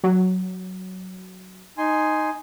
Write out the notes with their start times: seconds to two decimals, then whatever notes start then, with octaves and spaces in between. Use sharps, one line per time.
0.03 F#3
1.78 D#4 G#5 C6